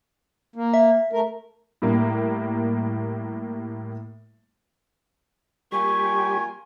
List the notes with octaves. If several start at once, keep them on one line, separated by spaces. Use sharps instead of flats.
A#3
E5
A3 A#4
A2 G3 A#3
G3 A#3 F4 G4 G#5 C#6